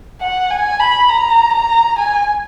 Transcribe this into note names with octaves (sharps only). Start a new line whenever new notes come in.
F#5
G#5
B5
A#5
A#5
G#5